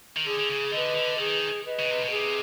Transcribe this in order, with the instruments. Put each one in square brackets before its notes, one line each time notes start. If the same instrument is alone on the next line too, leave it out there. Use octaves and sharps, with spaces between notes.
[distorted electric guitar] D#3
[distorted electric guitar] D3 [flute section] G#4
[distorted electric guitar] D3
C#3
[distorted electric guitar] D3 [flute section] B4 D#5
[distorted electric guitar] D3
[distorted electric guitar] D#3 [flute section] G#4
[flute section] B4 D#5
[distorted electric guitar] C#3
C3
B2
[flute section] G#4
[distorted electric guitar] C3